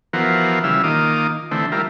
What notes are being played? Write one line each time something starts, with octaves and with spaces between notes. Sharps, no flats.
E3 F3 B3 F#4 A#4 C5
C#3 E3 G3 F5 E6
D#3 A#3 F4 D6 D#6
D3 E3 A3 C4
G3 E4 F4 A#4